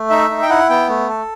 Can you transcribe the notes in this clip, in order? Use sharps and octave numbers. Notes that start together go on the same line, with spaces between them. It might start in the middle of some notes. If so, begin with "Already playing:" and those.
Already playing: A3
D#4 E5
D#4
G5
E4 F#5
B3 G5
A3
A4